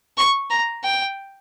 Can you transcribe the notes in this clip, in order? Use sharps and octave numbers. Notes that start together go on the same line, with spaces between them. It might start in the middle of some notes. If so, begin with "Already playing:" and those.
C#6
A#5
G5